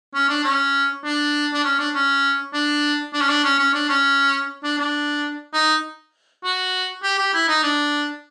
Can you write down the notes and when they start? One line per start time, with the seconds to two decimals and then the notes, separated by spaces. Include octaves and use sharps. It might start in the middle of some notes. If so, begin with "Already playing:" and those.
0.14 C#4
0.29 D4
0.44 C#4
1.05 D4
1.54 D4
1.64 C#4
1.79 D4
1.94 C#4
2.54 D4
3.13 D4
3.21 C#4
3.29 D4
3.44 C#4
3.59 C#4
3.74 D4
3.89 C#4
4.64 D4
4.79 D4
5.54 D#4
6.44 F#4
7.03 G4
7.18 G4
7.34 E4
7.48 D#4
7.63 D4